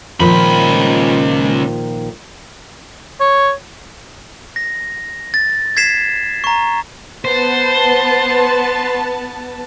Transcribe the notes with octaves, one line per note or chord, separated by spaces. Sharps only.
C#2 A#2 D#3 F3 B5
C#5
A#6
A6
G#6 B6 C7 E7
A#5 C#6
B3 C5 A5